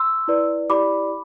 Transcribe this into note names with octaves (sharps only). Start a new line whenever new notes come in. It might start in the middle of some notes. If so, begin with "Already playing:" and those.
Already playing: C6 E6
E4 B4 D5
E4 G4 D5 B5 D6